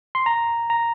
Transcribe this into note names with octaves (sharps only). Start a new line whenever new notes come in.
C6
A#5
A#5